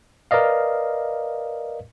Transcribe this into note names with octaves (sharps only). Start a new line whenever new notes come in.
A#4 B4 D5 D#5 F5